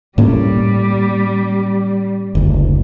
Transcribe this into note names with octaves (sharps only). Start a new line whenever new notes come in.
A2 G3 A#3 C#4
F#1 D2